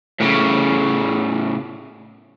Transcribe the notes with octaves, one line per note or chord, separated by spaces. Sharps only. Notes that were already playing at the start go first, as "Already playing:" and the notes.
A2 C#3